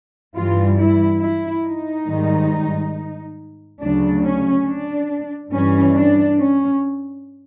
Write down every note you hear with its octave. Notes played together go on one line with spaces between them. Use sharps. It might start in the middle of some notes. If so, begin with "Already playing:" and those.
G2 E3 G3 F4
E4
E4
D#4
G#2 D#3 G3
D2 C#3 F#3 D4
C#4
D4
G2 E3 G3 C#4
D4
C#4